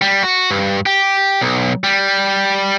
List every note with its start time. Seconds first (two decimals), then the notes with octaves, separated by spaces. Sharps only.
0.02 G3
0.23 F#4
0.51 G2
0.86 G4
1.41 B1
1.84 G3